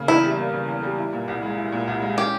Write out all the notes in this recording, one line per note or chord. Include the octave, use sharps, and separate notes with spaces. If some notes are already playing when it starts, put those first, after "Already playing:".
Already playing: C#3 A#3
E2 E4
G3
A#3
C#3
E2
G3
E4
A#2
C2
G#3
E4
A#2
C2
G#3
C#4 G4